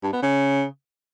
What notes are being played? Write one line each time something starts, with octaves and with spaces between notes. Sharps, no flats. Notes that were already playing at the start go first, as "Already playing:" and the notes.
G2
B3
C#3